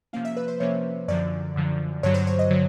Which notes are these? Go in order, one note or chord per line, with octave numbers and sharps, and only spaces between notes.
C3 F3 A#3 C#4 F5
E5
B4
C5
C3 F3 A#3 C#4 C#5
F#2 D3 F3 D5
F#2 D3 F3
G2 D3 F#3 C#5
C5
C#5
D#5
D3 F#3